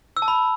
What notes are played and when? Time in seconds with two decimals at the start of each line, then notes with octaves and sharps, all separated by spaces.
0.17 E6
0.22 A5
0.28 B5